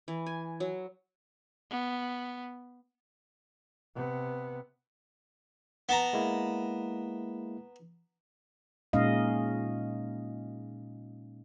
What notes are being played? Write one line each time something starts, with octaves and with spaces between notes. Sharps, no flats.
E3
G#5
F#3
B3
C3 B3
B3 A5 A#5
G#3 A#3 E4
A#2 G#3 C#4 D#4 D#5 F5